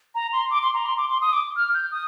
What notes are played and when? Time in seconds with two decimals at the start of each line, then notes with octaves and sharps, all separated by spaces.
0.15 A#5
0.33 C6
0.51 D6
0.62 C6
0.74 A#5
0.86 C6
0.98 D6
1.09 C6
1.21 D#6
1.33 D6
1.57 F6
1.74 G6
1.91 D#6